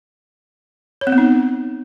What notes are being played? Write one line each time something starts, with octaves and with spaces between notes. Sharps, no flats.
C#5
C4
B3
D#4